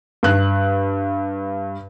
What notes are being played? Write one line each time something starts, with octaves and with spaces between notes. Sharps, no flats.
G2 F#6